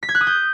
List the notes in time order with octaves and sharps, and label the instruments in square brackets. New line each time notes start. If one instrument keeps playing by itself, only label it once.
[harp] B6
G#6
F#6
D#6
G6